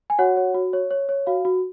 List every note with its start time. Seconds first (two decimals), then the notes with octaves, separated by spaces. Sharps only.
0.10 G#5
0.19 F#4 C#5 F#5
0.37 C#5
0.55 F#4
0.73 C#5
0.91 C#5
1.09 C#5
1.27 F#4 F5
1.45 F#4